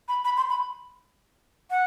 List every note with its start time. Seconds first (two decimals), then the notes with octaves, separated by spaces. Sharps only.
0.08 B5
0.25 B5
0.37 C6
0.49 B5
1.70 F#5